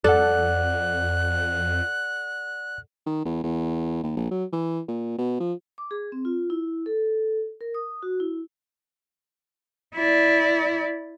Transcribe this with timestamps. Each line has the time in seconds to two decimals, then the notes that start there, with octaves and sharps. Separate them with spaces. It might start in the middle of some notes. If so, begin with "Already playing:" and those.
0.04 F2 A4 D5 F#5 F#6
3.06 D#3
3.25 E2
3.43 E2
4.03 D#2
4.17 A#1
4.31 F#3
4.52 E3
4.88 A#2
5.18 B2
5.40 F3
5.78 D6
5.91 G#4
6.12 C4
6.25 F4
6.50 E4
6.86 A4
7.61 A#4
7.74 D#6
8.03 F#4
8.20 E4
9.94 E4 D5